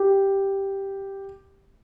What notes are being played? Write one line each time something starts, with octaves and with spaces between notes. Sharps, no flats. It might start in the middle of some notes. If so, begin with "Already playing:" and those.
Already playing: G4